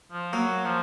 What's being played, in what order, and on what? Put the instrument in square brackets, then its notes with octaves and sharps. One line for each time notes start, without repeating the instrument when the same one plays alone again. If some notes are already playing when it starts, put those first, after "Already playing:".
[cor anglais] F3
[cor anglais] F#3 [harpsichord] A#3
[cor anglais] F3